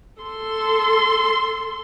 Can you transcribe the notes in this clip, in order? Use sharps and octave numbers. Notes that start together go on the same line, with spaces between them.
A4 C6